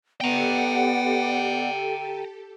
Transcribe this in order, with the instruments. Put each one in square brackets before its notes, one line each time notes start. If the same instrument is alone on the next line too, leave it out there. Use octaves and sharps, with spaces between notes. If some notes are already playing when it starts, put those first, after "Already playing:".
[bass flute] B3 [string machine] G4 A4 [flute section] D5 F#5 [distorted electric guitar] G5 A#5